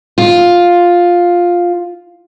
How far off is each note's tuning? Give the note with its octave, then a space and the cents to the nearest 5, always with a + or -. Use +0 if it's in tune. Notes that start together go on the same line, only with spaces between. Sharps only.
F4 +5